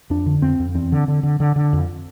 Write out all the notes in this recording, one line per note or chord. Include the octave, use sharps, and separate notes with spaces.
F2 D4
D3
F2 C4
F2
E2 C4
D3
D3
D3
D3
D3
F2